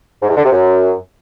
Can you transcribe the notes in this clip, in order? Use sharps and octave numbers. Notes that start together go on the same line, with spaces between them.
G#2
E2
D3
C3
F#2